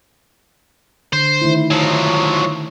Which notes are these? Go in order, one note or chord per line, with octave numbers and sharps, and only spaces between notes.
D3 C5
D#3 A3 E4
F3 F#3